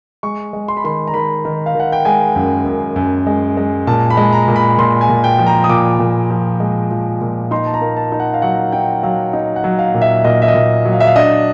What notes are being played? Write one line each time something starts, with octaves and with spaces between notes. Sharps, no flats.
G#3 C#6
G#3
C6
B5
D#3 C6
A#5
D#3 B5
D#3
F5
D#3 F#5
G5
G#3 G#5
F#2
F#2
F#2
G#3
G#3
A#2 A5
B5
G#3
A#5
A#2
B5
A#2 C6
G#5
A#2
G5
F3
A#5
D#6
A#2 D6
A#2
F3
G#3
F3
A#2
D#4 C6
A5
A#5
A#3
A5
D#4
F#5
F5
F#3 F#5
D#4 G5
F#3 F5
D#4
F#5
F#3
F5
A#2
E5
A#2 D#5
E5
D#5
A#2
F#3
F5
E5
F5
D4 D#5